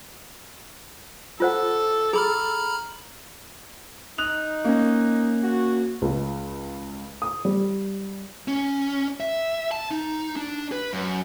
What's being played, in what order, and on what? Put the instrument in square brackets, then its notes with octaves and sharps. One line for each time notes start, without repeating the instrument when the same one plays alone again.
[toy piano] F4 C5 F#5 [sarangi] A4
[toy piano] G#4 [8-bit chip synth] A#5 B5 F6
[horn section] D#4 [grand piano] D#6 F#6 F7
[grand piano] A#3 C#4
[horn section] F#4
[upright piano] C#2
D#6
G3
[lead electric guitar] C#4
E5
A5
D#4
D4
B4
F#2